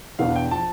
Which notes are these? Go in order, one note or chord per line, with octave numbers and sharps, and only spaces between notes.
E2 B2 B3 D4 F5
G5
F3 A5